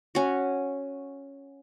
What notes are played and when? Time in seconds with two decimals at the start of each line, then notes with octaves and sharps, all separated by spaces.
0.15 C#4 F#4